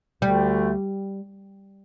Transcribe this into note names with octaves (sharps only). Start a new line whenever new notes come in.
D2 D3 G3 A3